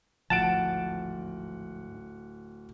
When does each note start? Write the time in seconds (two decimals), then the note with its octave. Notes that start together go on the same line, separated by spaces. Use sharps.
0.30 D1 G#1 F3 F#5 A5 D7